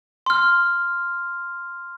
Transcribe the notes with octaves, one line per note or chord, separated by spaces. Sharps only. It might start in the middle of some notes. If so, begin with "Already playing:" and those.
C6 F6